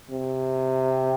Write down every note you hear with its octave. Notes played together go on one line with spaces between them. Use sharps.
C3